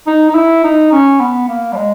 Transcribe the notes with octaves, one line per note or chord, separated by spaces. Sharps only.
D#4
D#4
E4
D#4
C#4
B3
A#3
G3
G#3